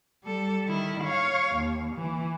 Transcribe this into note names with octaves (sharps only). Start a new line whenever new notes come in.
G3 A4
D#3 E4
C#5 F5
D#2
E3